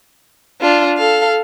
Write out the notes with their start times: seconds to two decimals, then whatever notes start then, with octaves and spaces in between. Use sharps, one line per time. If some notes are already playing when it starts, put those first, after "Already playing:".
0.61 D4 F4
0.98 A4 F5